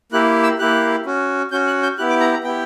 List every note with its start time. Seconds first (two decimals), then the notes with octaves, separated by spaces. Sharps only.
0.12 A#3 E4 G4 F#6
0.43 E6
0.59 A#3 E4 G4 F#6
1.06 C#4 F#4
1.51 C#4 F#4 G6
1.67 F#6
1.83 G6
1.98 B3 E4 G4 F#6
2.10 D6
2.20 A#5
2.33 A#5
2.44 B3 E4 G4 G5